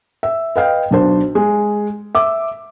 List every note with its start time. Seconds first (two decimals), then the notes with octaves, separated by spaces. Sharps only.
0.23 E5
0.56 B4 D#5 F5 G5
0.91 B1 D4 C5
1.35 G#3
2.15 E5 D6